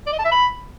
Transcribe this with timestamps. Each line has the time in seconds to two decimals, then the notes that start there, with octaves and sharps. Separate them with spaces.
0.06 D5
0.12 D#5
0.19 A5
0.25 E5
0.31 B5